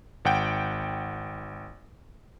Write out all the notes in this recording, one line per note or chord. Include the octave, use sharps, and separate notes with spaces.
G#1 F#5 G5 D7